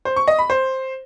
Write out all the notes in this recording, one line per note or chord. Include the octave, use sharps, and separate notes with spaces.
C5
C#6
D#5
B5
C5